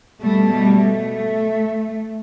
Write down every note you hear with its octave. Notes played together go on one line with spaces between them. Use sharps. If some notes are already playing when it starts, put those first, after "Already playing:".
B2 G3 A3
G3
A3